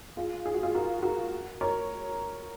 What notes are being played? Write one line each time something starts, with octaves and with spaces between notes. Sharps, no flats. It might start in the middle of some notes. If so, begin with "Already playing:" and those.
F4 G#4
G#4
F#4
F4 G#4
F#4 A#4
F#4 A#4
A#4 C#5